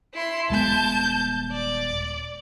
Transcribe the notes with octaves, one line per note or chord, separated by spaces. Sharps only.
E4 C6
D#1 G#3 B3 A5 G6
D5